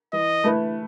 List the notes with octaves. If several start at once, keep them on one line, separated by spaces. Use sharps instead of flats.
E3 D#5
A3 E4 B4